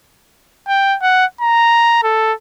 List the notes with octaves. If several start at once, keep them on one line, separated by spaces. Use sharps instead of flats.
G5
F#5
A#5
A4